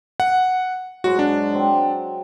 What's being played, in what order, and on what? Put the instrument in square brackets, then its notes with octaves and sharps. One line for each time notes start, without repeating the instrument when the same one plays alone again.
[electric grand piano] F#5
[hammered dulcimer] G#2 F#3 G#3 [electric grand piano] F#4
[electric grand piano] D4
[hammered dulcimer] F#3 C4